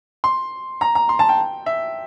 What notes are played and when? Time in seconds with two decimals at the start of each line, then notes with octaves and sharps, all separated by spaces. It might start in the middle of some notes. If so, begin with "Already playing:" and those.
0.24 C6
0.81 A#5
0.95 A#5
1.09 C6
1.19 A5
1.29 G5
1.66 E5